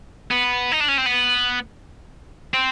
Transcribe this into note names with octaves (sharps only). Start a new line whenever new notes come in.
B3
D#4
D4
C#4
C4
B3
C4